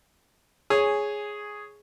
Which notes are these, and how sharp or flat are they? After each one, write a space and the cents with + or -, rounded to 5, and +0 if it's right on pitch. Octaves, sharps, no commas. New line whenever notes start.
G#4 +0 C#5 +0 G#5 -5